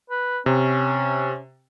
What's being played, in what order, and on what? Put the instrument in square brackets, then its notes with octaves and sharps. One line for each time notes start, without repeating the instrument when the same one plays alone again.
[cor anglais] B4
[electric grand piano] C3 [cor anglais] C#4